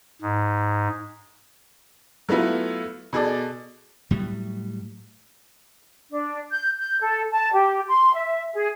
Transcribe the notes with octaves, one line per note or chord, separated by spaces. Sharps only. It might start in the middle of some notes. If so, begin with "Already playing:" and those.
G#2
F#3 A3 B3 E4 F4
B2 G#4 A4 D5
A2 F#3 G3
D4
G6
G6
A4
A5
G4
C6
E5
G#4